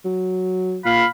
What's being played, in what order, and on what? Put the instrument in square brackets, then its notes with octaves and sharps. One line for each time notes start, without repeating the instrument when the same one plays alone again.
[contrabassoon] F#3
[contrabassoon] A#2 [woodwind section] F5 B5